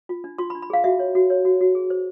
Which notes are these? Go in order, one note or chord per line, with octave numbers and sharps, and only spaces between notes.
F4
D4
F4 C6
B5
D4
B5
G#4 F5
F#4 E5
C#5
F#4
C#5
F#4
F#4
G#4
C5